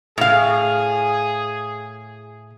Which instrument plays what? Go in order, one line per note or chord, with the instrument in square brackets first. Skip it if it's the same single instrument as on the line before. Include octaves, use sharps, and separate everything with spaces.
[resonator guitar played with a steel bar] A2 F5 [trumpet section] G#4